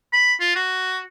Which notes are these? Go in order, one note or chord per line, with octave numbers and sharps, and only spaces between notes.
B5
F4
F#4